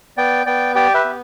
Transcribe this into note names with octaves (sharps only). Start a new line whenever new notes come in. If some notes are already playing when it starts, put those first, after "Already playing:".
B3 D5 G5
B3 D5 G5
G4 D5 G5
B4 E5
B3